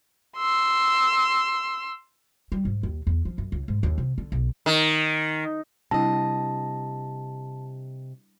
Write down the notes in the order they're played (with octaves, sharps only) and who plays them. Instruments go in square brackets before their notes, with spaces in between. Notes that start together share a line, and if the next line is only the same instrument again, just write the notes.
[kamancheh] C6 E6
[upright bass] G3
G#2
D#2
E2
F3
F#2
C#2
G#2
D#2
C3
D3
B1
[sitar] D#3
[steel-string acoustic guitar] C3 D#5 [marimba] G3 D4 E4 [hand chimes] A5